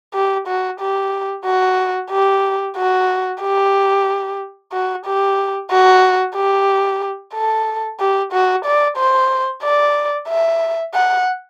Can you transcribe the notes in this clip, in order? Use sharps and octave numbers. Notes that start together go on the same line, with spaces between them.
G4
F#4
G4
F#4
G4
F#4
G4
F#4
G4
F#4
G4
A4
G4
F#4
D5
C5
D5
E5
F#5